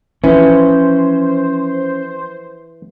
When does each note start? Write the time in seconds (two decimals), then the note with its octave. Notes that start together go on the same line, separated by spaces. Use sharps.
0.24 E3 F3 C#4 C5